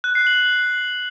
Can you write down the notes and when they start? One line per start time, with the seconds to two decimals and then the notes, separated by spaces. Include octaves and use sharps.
0.04 F#6
0.15 C7
0.27 F#7